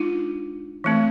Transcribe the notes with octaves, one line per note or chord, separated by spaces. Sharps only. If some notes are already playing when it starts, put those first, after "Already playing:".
Already playing: G#3 D4 D#4 F4
E3 A3 C4